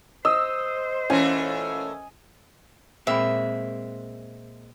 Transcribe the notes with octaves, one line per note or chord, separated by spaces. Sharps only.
C5 D#5 E6
A#2 E3 A3 C#4 G#5
A#2 G#3 A#3 C4 E5 B5